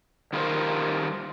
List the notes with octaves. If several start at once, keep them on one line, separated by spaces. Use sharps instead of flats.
D#3 G3 F4 A#4 C5